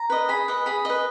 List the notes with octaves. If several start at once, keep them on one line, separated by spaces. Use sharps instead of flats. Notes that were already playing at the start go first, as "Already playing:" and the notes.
Already playing: A#5
B4 D#5
G#4 B5
B4 D#5
G#4 B5
B4 D#5